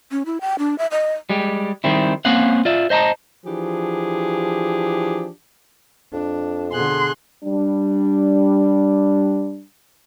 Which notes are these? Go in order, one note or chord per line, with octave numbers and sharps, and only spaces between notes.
C#4
E4
G5
D4
E5
D#5
G3 G#3 G4
D#3 G3 C4 E4
A#3 C4 C#4 F5 F#5
F4 D5 E5
C5 D#5 A5 A#5
E3 F3 D4 G4 G#4
F2 D4
B2 D3 G#4 C6 F#6
G3 D4